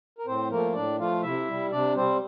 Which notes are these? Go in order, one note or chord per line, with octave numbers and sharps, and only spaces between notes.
A#4
A2 C4 C5
F3 A3 A#3 A#4
A2 D4 D5
F3 A3 F4 F5
C3 E4 E5
G3
C3 D4 D5
G3 C4 C5